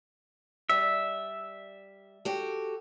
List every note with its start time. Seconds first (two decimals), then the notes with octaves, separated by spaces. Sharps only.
0.70 G3 E5
2.25 F#4 G4 A4